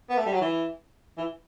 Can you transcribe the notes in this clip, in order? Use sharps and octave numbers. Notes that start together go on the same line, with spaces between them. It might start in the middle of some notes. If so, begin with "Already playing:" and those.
B3
A3
G3
F#3
E3
E3